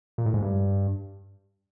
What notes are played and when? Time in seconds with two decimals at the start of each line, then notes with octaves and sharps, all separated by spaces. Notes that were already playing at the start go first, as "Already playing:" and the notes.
0.18 A#2
0.26 A2
0.34 G#2
0.42 G2